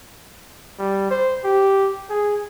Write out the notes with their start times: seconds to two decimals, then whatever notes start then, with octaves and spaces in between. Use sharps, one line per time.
0.79 G3
1.11 C5
1.44 G4
2.10 G#4